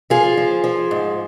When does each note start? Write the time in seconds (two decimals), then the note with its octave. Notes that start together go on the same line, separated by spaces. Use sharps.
0.10 F3 F4 G#4
0.37 F3
0.64 F3
0.91 G#2